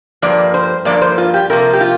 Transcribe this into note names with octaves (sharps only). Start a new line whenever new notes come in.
G2 F3 A#3 D5
C5
G2 F3 A#3 D5
C5
F4
G4
C3 F3 A#3 A#4
G4
F4